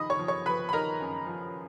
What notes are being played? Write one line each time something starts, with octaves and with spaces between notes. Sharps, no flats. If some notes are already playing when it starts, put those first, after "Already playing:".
Already playing: F3 D#4 D#5 B5 D#6
C#5 C#6
F3
C#5 C#6
F3 B4 B5
B5
D#4 A#4 A#5
F#2
F3